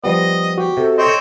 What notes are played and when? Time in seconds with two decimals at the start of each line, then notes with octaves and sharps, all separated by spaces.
0.04 F3 G3 B3 D#5
0.58 F#4 G4
0.77 C3 A4
0.98 C4 C5 C#5 D#5